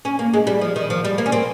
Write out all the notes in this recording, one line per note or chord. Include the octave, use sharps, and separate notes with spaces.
C#4
A#3
G#3
G3
F3
D#3
F3
G3
A#3
C#4
C4